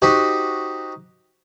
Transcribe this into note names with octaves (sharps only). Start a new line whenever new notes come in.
D#4 F#4 G4 C5